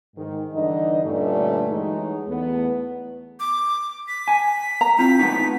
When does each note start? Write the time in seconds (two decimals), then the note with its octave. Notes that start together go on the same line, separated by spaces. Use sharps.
0.16 G#2 D#3
0.53 G2 D3 E3 D#4 D#5
1.04 G2 A#2 D3 A3 C#4 D#4
1.70 E3 F#3 G#3 D#4
2.28 E2 A3 B3
3.40 D6
4.08 B6
4.28 G#5
4.81 A#5
4.99 C4 E4 F4 B6
5.19 A3 B3 D#4